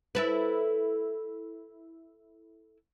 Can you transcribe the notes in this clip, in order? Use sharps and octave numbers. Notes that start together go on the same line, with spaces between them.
E4 A4 B4